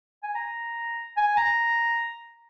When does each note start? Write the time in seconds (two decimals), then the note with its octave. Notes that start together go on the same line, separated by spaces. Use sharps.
0.23 G#5
0.35 A#5
1.17 G#5
1.37 A#5